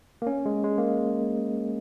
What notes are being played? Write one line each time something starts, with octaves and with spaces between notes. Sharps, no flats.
A#3
C#4
G#3
G#3
A#3